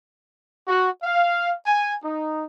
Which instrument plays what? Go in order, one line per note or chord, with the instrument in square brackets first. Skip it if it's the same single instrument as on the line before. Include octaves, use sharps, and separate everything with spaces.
[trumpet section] F#4
F5
G#5
D#4